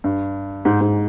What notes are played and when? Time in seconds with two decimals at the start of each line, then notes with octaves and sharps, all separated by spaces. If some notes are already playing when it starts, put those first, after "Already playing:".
0.04 G2
0.65 G#2
0.81 G#2